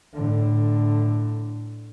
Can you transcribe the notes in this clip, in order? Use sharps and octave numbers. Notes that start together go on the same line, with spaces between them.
A2 D3